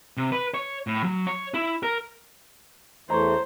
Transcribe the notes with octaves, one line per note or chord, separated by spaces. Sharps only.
C3
B4
C#5
A2
F#3
C#5
E4
A#4
E2 E3 A3 C5 C#5 A#5